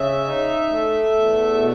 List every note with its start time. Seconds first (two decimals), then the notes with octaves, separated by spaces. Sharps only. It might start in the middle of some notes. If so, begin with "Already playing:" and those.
Already playing: C#3 E5
0.24 D#4
0.69 A3
1.12 E2
1.55 B2